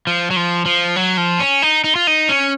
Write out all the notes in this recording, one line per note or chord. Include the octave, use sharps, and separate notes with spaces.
F3
F#3
F3
F3
F#3
F3
C#4
D#4
D#4
F4
D#4
C#4